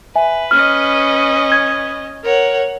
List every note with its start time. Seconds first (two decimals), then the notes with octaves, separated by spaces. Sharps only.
0.16 B4 E5 G#5
0.51 C#4 D#5 F6
1.52 G#6
2.23 A#4 C#5 F#5